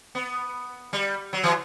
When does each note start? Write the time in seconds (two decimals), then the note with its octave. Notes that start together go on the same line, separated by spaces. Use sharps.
0.15 B3
0.93 G3
1.33 F#3
1.43 E3